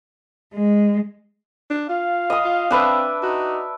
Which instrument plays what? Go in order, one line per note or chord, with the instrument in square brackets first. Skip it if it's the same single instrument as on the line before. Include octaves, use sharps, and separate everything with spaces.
[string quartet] G#3
[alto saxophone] D4
[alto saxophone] F4 [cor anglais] F5
[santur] D#5 D#6
[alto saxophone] F4
[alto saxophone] C4 [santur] D4 B4 E5
[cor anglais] D#4 [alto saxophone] F#4